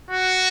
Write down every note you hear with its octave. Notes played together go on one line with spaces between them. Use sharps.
F#4